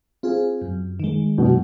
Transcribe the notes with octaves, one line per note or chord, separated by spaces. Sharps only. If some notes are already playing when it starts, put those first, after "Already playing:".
C4 F4 G#4
F#2
D#3 G#3
F#2 B2